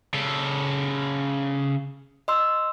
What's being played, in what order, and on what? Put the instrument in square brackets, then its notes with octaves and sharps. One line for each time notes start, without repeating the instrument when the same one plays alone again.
[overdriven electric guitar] C#3 A4
[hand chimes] D#5 C6 E6